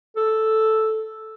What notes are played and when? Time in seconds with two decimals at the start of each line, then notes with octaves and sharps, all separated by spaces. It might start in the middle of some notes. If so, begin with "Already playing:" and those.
0.16 A4